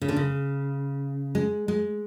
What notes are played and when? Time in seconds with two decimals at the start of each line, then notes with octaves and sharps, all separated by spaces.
0.01 C#3
0.08 D3
0.16 C#3
1.35 G#3
1.68 G#3